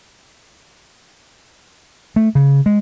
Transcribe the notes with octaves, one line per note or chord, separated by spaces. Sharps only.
A3
C#3
G#3